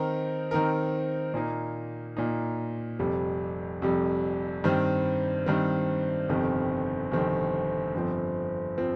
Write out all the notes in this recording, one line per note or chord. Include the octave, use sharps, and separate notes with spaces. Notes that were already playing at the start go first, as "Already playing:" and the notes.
Already playing: D#3 C4 D#4 A#4
D#3 C4 D#4 A#4
A#2 A#3 D#4
A#2 A#3 D#4
F1 F2 C3 G3
F1 F2 C3 G3
G2 D#3 C4
G2 D#3 C4
G1 F2 C3 D#3 C4
G1 F2 C3 D#3 C4
G1 F2 F3 C4
F3 C4